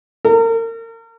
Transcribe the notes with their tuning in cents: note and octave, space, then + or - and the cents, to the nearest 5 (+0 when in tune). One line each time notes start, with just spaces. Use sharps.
A#4 -35